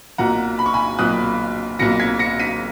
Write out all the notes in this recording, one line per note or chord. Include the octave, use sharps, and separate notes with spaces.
B1 A#2 F#3 F#5 A#5
B5
C#6
G#5 B5
B1 A#2 F#3 D#6 F#6
B1 A#2 F#3 A#6 C#7
G#6 B6
A#6 C#7
B6 D#7